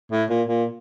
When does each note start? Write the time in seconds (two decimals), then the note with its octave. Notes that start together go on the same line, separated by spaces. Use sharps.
0.11 A2
0.29 A#2
0.48 A#2